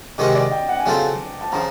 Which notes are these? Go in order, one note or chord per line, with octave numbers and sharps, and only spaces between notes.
C3 D#3 G#3 C#4 F#4 D#5
D5
G5
F#5
G#5
C#3 F#3 A3 C4 F4 A5
A5
C#3 F3 A#5